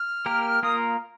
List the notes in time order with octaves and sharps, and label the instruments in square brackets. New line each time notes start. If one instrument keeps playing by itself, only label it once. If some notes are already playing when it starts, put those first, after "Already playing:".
Already playing: [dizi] F6
[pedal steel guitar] A#3 G4 A#4
[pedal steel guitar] A#3 F4 A#4 [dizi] D#6